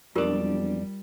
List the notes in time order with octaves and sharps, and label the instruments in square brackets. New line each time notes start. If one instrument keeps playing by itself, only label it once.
[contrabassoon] E1 [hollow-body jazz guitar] F2 D4 [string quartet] G3 [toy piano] F4 G4 A#4